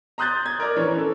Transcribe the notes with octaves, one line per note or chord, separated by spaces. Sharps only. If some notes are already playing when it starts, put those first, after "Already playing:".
A#5 C6 D#6 F#6 G6 A6
G#6
A#4 D5
E3 C#4 C#5
A4